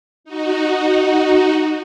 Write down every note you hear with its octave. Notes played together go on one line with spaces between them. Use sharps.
D#4 F#4